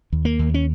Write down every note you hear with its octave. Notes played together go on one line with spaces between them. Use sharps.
D#2
A#3
D#2
C#4